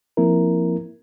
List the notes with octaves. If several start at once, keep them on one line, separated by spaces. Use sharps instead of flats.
F3 A#3 C4 E4 A#4